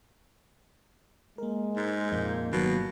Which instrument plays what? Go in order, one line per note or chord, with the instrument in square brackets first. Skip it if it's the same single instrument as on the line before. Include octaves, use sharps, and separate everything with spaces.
[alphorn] G#3 [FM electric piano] A#3 A#4
[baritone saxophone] G#2
[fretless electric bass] F2 A#2 [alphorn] A#3 [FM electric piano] D#5 G6
[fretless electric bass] G1 [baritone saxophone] B2 [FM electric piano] D#3 F#3 [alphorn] A#3